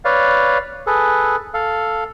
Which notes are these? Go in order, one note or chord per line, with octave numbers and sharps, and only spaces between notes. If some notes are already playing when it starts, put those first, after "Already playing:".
B4 C#5 D5 F5
G#4 A4 B4
A4 F5